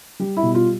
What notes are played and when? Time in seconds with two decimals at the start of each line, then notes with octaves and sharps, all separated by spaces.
0.20 G3 G4
0.37 E4
0.43 B2
0.54 F4